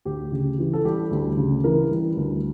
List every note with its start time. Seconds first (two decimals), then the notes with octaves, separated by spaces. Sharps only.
0.05 D2 G4
0.32 C#3
0.59 E3
0.73 A4
0.84 G3 G4
1.11 D2
1.37 C#3
1.64 E3 A#4
1.90 G3
2.17 D2